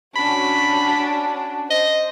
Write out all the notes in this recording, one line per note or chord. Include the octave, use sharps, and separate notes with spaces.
C#4 D4 F#4 B5
C5 D#5